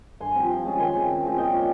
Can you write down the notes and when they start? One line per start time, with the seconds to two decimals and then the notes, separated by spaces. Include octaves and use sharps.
0.20 G2 G#5 C6
0.35 F3 C4
0.49 F3
0.65 G#3 C#4 F4
0.79 D#3 G#5 C6
0.94 G#3 C4
1.08 C#3
1.24 F3 G#3 C4
1.37 A#2 D#5 G5
1.53 G3 C#4